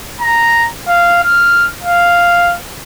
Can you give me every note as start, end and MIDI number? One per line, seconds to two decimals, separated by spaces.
0.21 0.64 82
0.88 1.20 77
1.23 1.66 89
1.83 2.54 77